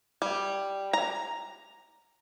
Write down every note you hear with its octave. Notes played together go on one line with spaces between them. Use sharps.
G3
A#5